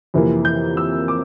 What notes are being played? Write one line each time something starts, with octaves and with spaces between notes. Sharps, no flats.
F2 C3 E3 A#3
G6
E6
D6